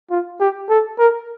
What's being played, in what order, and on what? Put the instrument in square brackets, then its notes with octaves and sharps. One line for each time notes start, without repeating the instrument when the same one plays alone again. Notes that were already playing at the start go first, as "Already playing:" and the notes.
[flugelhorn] F4
G4
A4
A#4